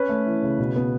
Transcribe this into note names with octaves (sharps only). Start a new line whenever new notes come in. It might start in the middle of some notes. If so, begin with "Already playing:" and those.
Already playing: C#4 B4
A3
E3
C#3
B2
B3